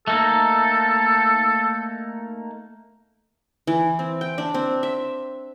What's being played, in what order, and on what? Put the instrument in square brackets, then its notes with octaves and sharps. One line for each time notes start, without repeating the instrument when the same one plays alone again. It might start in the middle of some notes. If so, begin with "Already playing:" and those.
[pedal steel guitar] A3 A#3 D#4 [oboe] A4
[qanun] E3
C4
G5
D4
C4
E5